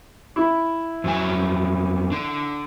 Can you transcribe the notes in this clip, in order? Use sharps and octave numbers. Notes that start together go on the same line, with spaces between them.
E4
F2 F#3 G#5
D4 A4